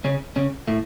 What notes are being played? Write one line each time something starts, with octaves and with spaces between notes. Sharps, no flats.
C#3 C#4
C#3 C#4
A2 A3